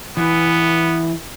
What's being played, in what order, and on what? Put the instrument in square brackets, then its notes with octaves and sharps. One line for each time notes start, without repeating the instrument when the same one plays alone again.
[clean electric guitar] E3 [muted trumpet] B3